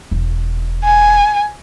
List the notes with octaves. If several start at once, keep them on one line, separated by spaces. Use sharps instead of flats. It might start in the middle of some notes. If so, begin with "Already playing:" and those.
E1
G#5